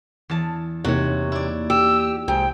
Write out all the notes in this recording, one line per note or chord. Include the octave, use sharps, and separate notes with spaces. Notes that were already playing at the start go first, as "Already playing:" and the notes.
E2 A5
E2 C3 A#3 D#4 F#4 C#5
E4 D5
G4 E6
C2 G#2 G5 G#5